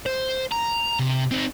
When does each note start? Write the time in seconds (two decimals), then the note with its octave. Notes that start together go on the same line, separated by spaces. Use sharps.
0.06 C5
0.51 A#5
0.99 C3
1.31 C4 D#4